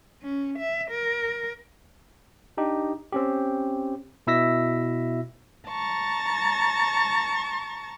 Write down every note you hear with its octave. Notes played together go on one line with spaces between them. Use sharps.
C#4
E5
A#4
D4 D#4 G4
C4 C#4 G4
B2 E4 E5 E6 A#6 B6
A5 A#5 C#6 A6